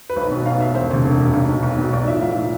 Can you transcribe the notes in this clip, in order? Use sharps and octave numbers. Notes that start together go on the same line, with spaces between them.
B4
B1 C5
B2
B1 F5
B2 E5
E1 C5
D2 C3
E1
D2 C3
B1
B2
B1
B2
B1 D5
A2 F3 E5
B1 F5
A2 F3